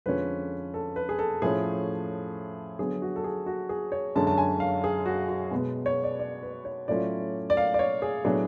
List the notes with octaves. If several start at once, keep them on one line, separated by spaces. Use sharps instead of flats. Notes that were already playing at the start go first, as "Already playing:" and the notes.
F2 D3 F3 G#3 C#4 B4
A4
B4
G#4
A4
A2 F3 A3 C#4 G#4
D3 F#3 B3 G#4
F#4
A4
G#4
F#4
G#4
C#5
F#2 D3 G#3 C#4 A5
A5
G#5
F5
G#4
F#4
F#4
B2 G#3 B3
C#5
D5
D5
B4
C#5
A2 F#3 A3 C#4 F4 D5
D5
F5
D5
C#5
G#4
A2 F#3 B3 D4 G#4